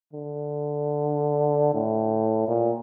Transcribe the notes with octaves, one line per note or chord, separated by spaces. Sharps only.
D3
A2
A#2